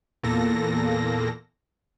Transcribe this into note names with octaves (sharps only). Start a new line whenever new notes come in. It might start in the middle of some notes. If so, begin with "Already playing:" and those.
E2 A#2 A#3 A4 A#6